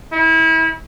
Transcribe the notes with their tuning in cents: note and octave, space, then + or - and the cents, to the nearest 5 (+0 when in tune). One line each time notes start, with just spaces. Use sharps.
E4 -30